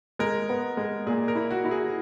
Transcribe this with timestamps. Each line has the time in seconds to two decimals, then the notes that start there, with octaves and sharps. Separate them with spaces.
0.19 G#3 A#4
0.49 B3
0.77 G#3
1.06 A#2 G#4
1.28 A#4
1.35 E4
1.51 F#4
1.65 E4
1.71 G#4